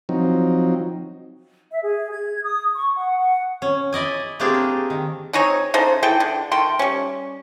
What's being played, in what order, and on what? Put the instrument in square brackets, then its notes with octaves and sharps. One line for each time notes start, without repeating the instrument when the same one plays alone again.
[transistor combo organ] F3 F#3 C4 D#4
[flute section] E5
G#4
G#6
D#6
C#6
F#5
F#5
[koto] C#4
E4 D5 D#5 G#5
A3 A#3 C4 D4 G4 G#4
A#4
D#3
[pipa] C4 D#4 G#4 C#5
C#3 D#4 A4 C5
E3 G#4 A4 G5
D3
D#3 A3 G5 C6
G3 C#4